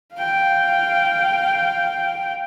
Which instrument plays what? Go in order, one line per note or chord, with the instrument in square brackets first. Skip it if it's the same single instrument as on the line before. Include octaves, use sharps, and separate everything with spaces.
[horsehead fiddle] F5 G5